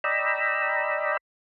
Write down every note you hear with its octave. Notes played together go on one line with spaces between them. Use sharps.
D5 D#5 G5 A#5 B5 E6